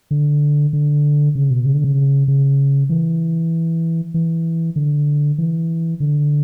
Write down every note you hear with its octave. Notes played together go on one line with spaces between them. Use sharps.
D3
D3
C#3
B2
C#3
D3
C#3
C#3
E3
E3
D3
E3
D3